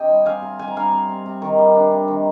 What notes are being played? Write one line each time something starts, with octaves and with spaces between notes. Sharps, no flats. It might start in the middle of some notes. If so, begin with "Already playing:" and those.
Already playing: C3 D#5 G5
G3
C4 F5 G#5
C3
C3 G#5
A#5
G3 F5 G#5
C4
C3
C3
D#3
G3
D4
C3
D#3